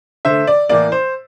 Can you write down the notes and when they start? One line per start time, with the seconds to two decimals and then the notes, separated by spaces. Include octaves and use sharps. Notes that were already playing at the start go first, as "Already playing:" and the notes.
0.25 D3 A3 C5 E5
0.47 D5
0.69 A2 E3 A#3 D5
0.92 C5